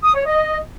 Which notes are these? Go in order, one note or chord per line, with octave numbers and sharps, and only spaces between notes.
D#6
C#5
D#5